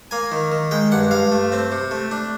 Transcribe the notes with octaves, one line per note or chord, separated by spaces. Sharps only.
A#3 G#5
D#3
D#3
G#3 G5
G2 F#5
G2 F5
A3
C4
C3
A3
D4